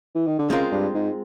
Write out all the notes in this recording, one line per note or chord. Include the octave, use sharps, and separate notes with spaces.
E3
D#3
D3
C#3 G#3 C4 F4 A#4
G2
G#2